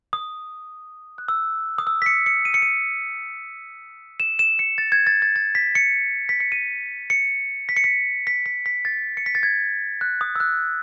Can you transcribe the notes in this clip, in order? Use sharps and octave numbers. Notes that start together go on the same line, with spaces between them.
D#6
F#6
E6
D#6
E6
B6
C#7
C#7
D#7
C#7
D#7
E7
E7
C#7
A6
G#6
A6
A6
A6
B6
C#7
B6
C#7
D#7
C#7
B6
C#7
B6
B6
B6
B6
A6
C#7
B6
A6
G#6
F#6
D#6
E6
F#6